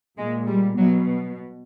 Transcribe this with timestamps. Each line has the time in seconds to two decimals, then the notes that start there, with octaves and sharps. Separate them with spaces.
0.18 A#2 G#3
0.47 G3
0.77 B2 F#3